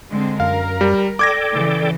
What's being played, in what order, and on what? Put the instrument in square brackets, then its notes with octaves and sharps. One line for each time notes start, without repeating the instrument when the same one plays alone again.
[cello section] D3 G#3 C4
[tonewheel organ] F#2 [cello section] A#4 [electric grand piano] F5
[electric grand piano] G3
[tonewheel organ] A4 D5 G5 [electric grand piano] D6 G#6 A#6
[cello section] C#3 E3